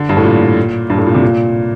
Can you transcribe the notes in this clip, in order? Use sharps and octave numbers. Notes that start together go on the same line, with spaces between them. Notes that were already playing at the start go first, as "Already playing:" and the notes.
Already playing: D3
G2
A2
A#2
G2
A2
A#2
C3
A#2